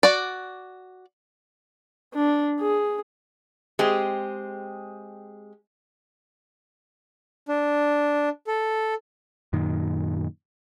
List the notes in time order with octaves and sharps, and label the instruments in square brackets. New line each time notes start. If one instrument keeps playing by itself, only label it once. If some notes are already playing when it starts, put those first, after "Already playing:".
[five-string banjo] F#4 D5
[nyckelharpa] D4
G#4
[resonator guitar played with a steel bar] G#3 C4 G4 G#4
[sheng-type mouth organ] D4
A4
[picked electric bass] F#2 A#2 D#3